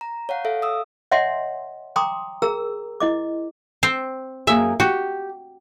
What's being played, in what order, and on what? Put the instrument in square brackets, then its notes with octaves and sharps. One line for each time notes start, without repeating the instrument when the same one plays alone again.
[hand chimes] A#5
C#5 F5 F#5
A4 E5 F5
D#6 E6
[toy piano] C#5 D#5 E5 F#5 G#5 C6
G5 A#5 C6 D6 D#6
G#4 A#4 A#5 E6
E4 D#5 D6
[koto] C4 C5
[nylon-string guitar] F#2 A#3 G#4 [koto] E5
[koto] F#4 [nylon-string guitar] G4